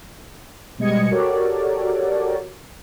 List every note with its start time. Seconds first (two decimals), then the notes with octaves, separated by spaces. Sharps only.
0.78 B2 G3 G#3 D#5 G#6 C#7
1.10 F#4 G4 A4 A#4 C#5 D5